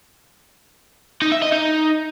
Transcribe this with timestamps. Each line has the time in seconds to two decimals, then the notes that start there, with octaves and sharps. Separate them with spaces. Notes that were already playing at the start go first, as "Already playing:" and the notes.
1.22 D#4
1.32 E5
1.42 D#5
1.52 D#4